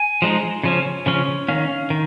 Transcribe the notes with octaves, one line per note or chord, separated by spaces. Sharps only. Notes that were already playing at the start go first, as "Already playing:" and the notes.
Already playing: G#5
F3 G#3 D#4
C#3 F3 C#4
C#3 F3 C#4
D#3 C#4 F5
D#3